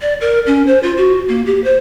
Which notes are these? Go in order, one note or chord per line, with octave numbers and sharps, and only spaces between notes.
D5
A#4
C#4
C5
F4
F#4
A#3
G4
C5